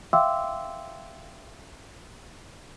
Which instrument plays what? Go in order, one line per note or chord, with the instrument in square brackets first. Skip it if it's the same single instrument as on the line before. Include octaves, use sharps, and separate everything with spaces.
[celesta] E5 F5 G5 C6 D6 E6